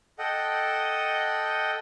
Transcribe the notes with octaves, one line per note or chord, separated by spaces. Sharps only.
A4 D#5 F#5 G5